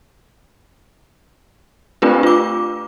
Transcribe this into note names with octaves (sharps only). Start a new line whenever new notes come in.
A3 C4 D4 F4 G4 B4
F4 D6